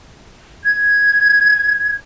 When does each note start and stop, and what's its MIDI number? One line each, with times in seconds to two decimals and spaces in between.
0.63 1.95 92